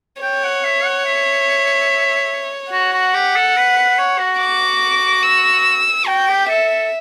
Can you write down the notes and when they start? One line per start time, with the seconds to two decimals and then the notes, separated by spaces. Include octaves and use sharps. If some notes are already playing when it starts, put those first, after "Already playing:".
0.22 C#5 G5
0.44 F#5
0.64 E5
0.85 F#5
1.06 E5
2.72 F#4 F#5
2.93 F#4
3.14 G4
3.36 A4
3.57 B4
3.77 B4
3.98 C#5
4.19 F#4
4.39 D6
5.23 E6
6.06 F#4 G5
6.28 G4
6.49 A4 E5
6.69 A4